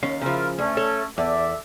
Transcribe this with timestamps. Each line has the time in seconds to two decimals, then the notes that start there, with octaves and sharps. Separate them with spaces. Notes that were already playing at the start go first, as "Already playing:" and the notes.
0.03 D#2 C#4 F5
0.21 C#3 F3 E4 F4 A#4
0.58 D2 A3 C#4
0.77 A4 C#5
1.18 E2 A4 D5 E5